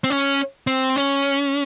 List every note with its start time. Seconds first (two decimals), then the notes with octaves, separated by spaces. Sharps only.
0.04 C4
0.10 C#4
0.67 C4
0.96 C#4